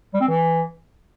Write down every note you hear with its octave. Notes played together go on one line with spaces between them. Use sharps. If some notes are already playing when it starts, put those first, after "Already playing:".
G3
C4
E3